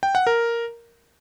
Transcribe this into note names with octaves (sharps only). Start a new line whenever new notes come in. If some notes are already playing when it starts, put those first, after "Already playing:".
G5
F#5
A#4